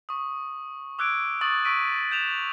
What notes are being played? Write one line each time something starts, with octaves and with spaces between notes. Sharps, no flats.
C#6 D#6
D6 E6 F#6 G#6 D7
C#6 D#6 A6 F#7
C#6 E6 B6 D7 D#7
G6 E7 F7